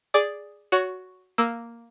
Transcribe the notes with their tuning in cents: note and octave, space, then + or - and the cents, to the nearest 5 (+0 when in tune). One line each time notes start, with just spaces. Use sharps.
G#4 -5 D5 +0 D6 +0
F#4 +0 C#5 +25
A#3 +0 E6 +0